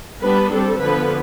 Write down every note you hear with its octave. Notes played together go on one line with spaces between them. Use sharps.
G3 B3 D4 B4
G3 C4 A4
D3 F3 B3 B4